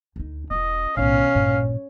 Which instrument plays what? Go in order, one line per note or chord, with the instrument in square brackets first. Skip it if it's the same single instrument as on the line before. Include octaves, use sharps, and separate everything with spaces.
[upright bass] D2 D#4
[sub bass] E1 [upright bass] C#4 F4 [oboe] D#5
[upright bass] B1 D#3 [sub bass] A2 [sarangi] C#4 [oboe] F5
[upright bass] A1 G2 [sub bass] A#2